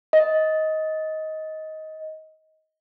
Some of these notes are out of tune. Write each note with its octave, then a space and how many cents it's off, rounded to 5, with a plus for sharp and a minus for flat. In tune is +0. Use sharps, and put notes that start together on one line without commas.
D#5 +15